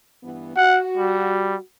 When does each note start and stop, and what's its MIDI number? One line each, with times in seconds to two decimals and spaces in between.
0.23 0.55 43
0.23 0.55 52
0.23 0.55 59
0.57 1.62 66
0.57 0.81 78
0.97 1.56 55